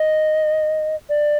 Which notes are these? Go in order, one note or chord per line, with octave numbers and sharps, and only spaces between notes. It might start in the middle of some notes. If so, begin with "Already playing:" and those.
Already playing: D#5
D5